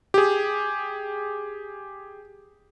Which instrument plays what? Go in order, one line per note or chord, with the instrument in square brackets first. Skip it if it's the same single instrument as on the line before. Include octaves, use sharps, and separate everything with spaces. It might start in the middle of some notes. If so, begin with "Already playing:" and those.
[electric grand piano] G4 G#4